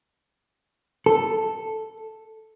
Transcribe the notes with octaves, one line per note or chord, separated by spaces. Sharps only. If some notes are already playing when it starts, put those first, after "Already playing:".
A4